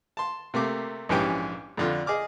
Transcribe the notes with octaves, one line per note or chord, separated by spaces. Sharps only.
A5 C6
C3 A3 A#3 D6
A#1 G#2 E3 C#4 G4 G5
F2 D3 F4
G#4 D#5 D6 F6